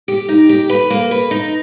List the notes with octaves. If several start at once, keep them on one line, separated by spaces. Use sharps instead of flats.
G4
D#4
G4
B4
A#3
B4
D#4